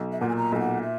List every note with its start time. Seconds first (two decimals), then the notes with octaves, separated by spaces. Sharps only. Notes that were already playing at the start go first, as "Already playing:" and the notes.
Already playing: B1
0.12 E5
0.20 A#2 F#5
0.29 G#5
0.36 A#5
0.52 B1 G#5
0.60 F#5
0.83 E5